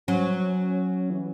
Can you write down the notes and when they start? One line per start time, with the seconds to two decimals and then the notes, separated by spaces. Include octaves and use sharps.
0.08 F#3 C#4
1.10 E3